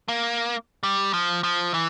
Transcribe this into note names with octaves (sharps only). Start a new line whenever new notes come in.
A#3
G3
F3
F3
E3